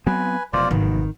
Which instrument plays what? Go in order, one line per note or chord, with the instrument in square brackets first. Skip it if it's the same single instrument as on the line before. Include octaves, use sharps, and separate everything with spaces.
[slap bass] F#3 B3 C4 [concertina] B4 G#5
[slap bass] F1 B2 F#3 [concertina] F4 C5 D5
[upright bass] G#1 [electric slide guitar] D#3 [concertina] B3